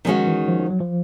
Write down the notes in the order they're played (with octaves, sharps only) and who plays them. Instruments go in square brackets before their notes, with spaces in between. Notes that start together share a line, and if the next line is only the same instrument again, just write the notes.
[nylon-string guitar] D#3 G#3 C#4 F#4 [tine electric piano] F3
[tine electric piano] E3
F3
F3
F#3
F3